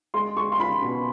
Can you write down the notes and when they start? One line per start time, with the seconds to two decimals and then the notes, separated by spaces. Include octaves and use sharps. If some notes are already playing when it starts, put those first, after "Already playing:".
0.14 G#3 C6
0.36 G#3 C#6
0.52 C6
0.59 F4 B5
0.82 B2